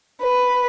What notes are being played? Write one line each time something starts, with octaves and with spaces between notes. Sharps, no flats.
B4